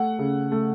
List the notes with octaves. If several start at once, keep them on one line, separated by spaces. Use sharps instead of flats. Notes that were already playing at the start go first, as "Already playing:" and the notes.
Already playing: A3 F#5
C#3
A3